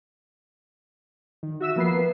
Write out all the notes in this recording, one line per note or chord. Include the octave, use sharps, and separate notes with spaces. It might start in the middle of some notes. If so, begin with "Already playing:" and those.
D#3
F#4 E5 E6 E7
F3 A#3 B3 B4 C7